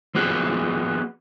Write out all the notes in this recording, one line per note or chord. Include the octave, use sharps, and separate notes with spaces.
F3 A#3 B3 F#4 G#4